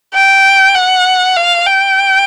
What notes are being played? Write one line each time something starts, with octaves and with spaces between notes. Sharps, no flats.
G5
F#5
F5
G5